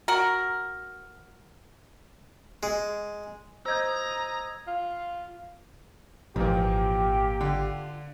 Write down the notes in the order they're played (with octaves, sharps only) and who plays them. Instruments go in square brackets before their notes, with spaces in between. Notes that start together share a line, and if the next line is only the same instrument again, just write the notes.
[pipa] F#4 A#4
[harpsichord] G#3
[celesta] C5 D#5 G6 [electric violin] A#5 D#6 [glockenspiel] E6 G#6
[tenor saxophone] F4
[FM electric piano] G#1 [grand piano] A#2 E3 A#3 [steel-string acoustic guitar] F3 [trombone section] G4
[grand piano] D3 [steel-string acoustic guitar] F4